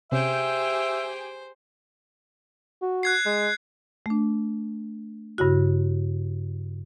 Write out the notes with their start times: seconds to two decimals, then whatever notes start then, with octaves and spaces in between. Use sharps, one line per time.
0.12 C3 C#4 G4 G#4 C5 E5 G5 G6
2.82 F#4
3.03 F#6 G#6 C7
3.26 G#3
4.06 A3 D4
5.38 G2 C#3 E4 F#4